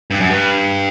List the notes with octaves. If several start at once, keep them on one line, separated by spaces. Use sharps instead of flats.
G2
F#2
G2